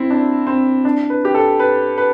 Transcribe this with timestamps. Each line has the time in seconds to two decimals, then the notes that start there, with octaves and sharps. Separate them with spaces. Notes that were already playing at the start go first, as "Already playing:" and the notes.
Already playing: C4 E4
0.10 D4
0.47 C4
0.85 D4
1.10 B4
1.25 G4
1.35 A4
1.60 B4
1.98 B4